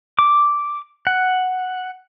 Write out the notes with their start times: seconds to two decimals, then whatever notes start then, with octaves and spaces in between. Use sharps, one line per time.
0.19 D6
1.07 F#5